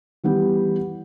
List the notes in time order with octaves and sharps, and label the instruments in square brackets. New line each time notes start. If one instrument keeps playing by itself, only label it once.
[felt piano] E3 G3 B3 G4